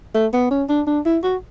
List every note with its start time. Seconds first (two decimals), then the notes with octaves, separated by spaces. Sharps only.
0.14 A3
0.33 B3
0.51 C#4
0.69 D4
0.87 D4
1.05 E4
1.23 F#4